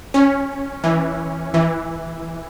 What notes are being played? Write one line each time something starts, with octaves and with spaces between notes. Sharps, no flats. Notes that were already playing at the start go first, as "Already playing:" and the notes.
C#4
E3
E3